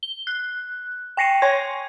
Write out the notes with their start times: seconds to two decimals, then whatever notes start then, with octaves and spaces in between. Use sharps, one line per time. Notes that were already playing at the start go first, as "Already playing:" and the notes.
0.03 G7
0.27 F#6
1.17 G5 G#5 A#6 C7 C#7 D#7
1.42 C#5 G#5 C6 C#6 G#6